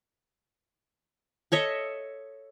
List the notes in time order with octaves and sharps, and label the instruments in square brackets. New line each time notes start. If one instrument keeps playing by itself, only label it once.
[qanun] A4 C#5 D#5 E5